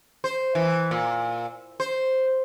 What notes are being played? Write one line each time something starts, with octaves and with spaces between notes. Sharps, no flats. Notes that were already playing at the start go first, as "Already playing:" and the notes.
C5
E3
A#2
C5